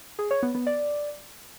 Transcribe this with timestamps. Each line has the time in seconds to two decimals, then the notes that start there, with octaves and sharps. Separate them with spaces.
0.19 G#4
0.31 C#5
0.43 B3
0.55 B3
0.67 D5